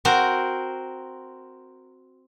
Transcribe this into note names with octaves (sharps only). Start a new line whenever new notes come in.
C4 F#4 A#4 C5